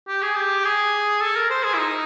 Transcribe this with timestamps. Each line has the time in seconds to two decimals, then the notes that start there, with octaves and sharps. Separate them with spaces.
0.08 G4
0.22 G#4
0.36 G4
0.65 G#4
1.21 A4
1.35 A#4
1.50 C5
1.64 G#4
1.74 E4
1.78 D#4